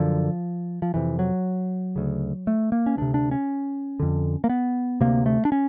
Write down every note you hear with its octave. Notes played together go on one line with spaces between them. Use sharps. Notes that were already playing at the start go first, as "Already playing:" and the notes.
Already playing: F#2 D3 F3
F3
F2 C3 E3
F#3
D2 C#3
A3
A#3
C#4
D2 C3 D4
D4
C#4
F2 D3
A#3
B3
D2 C3 A#3
A3
D4
C#4